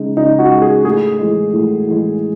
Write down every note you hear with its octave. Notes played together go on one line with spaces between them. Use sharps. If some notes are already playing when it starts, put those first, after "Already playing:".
Already playing: C#3 G#3 D#4
C#3 D#4
F#4
G#3
G#4
A2 G#4
E3 G#3
A2
E3 G#3